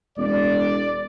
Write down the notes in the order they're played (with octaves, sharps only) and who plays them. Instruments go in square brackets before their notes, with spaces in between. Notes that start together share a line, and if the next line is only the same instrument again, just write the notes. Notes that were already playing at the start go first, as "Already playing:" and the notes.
[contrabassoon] E1 [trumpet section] D5